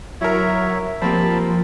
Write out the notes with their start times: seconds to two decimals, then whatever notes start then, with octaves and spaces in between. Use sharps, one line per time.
0.21 F#3 E4 A#4 C#5 E5
1.02 F3 G3 A#3 C4 A5 B5